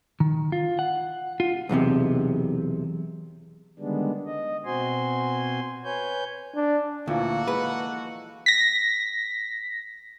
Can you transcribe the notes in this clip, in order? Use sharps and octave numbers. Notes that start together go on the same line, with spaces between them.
D#3
F4
F#5
F4
B1 E2 A2 C3
D3 D#3 G3 G#3 B3 D4
D#5
B2 C4 F#4 C5 G#5 C6
B4 C#5 G#5 G6
D4
D2 A#2 E3 F3 A#3 F#4 A4 F#5
G#3 B4
A#6 B6